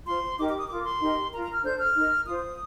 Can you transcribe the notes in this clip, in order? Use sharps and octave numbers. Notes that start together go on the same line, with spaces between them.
F4 C5 C6
D#4 G4 A#4 D6
D6
D#6
F4 A#4 D6
C6
D#4 G4 A#4
F4 A#4 A#5
A#5
F6
D4 A4 C5 G6
F6
D#4 A#4
F4 C5 D#6